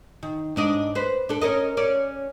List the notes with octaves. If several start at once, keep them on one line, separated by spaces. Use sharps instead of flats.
D#3
G#2 D4 D#5
B4 C5
D4 A4
C#4 A#4 D#5
C#4 D5